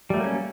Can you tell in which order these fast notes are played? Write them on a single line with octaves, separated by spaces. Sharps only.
G3 A3 F#3 A#3 C#4